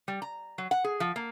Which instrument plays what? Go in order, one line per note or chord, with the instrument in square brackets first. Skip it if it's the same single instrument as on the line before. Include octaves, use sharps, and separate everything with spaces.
[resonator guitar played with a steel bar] G3
A#5
F#3
F#5
G#4
F3
A#3